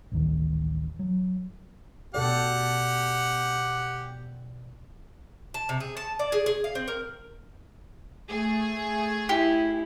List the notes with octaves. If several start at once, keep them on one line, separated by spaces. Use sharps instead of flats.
A1 D2 D#3
F#3
B2 G4 A4 D5 F#5
A5
C3
G#4
A5
D5
G#4
G#4
F5
C4
A#4
A3 G#4
E4 G4